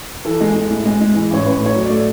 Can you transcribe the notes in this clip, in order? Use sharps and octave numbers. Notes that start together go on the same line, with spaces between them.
E3 A4
G#3
G#3
A2
G#3
G#3
E3
A1 C#5
A1 B4
A3
C#5
F#3
D5
A3